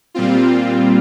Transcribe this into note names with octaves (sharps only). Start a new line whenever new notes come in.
A#2 G3 C4 F4